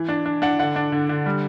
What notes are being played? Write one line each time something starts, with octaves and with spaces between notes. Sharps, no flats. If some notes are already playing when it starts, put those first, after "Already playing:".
Already playing: E3
D4
D4
D4 F#5
D3 F#5
D4
D3
D3
G3